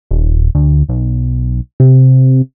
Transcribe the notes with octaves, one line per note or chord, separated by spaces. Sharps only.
D#1
D2
B1
C3